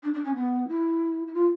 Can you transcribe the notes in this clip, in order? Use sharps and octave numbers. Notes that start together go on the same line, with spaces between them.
D4
D4
C#4
B3
E4
E4
F4